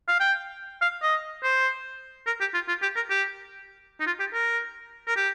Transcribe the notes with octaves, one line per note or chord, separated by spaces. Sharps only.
F5
G5
F5
D#5
C5
A#4
G4
F4
F4
G4
A#4
G4
D#4
F4
G4
A#4
A#4
G4